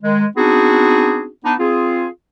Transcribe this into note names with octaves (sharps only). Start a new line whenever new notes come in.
D#3 G#3
B3 C4 D4 D#4 F#4 G#4
B3 D4 D#4
C4 F4 G#4